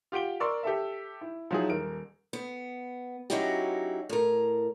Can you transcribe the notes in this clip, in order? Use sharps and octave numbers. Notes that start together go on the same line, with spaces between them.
F4 G4 F#5 D7 G7
A#4 D5 C6 C#6 E6
G4 A4 E5
E4
F3 F#3 D#4 E4 G#4
D#1 A#4 D7
B3
F#3 C#4 D#4 E4 F#4 G4
A2 A#4